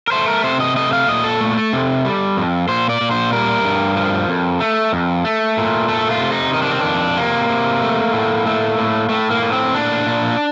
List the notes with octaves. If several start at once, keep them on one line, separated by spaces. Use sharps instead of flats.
A#4
A3 C5
A#4
C3 C5
D#5
A3 D#5
F5
A#2 D#5
A4
A3
C3
G3
F2
A#2 C5
D5
A#2
C5
G3 A#4
G2
F3
F2
A3
F2
A3
A#2
A3 A4
F4
C3
D#4
D#3 D#4
D4
C4
D4
F2
C3 A#3
C3
A3
A2
A3
A2
A2 A3
A#3
A2
C4
A#2 D4
A#2